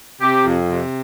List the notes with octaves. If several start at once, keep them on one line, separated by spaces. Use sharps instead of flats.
C3 G4
F2
C3